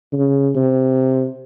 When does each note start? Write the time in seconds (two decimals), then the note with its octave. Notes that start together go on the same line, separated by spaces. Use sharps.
0.13 C#3
0.56 C3